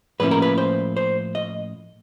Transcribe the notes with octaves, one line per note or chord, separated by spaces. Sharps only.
A2 F3 A#3 C#4 E4 B4
A#4
B4
C5
C5
D#5